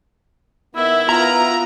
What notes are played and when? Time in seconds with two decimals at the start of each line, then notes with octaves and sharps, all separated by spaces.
0.75 D#3 B3 E4 E5
1.09 B3 F4 E5 A#5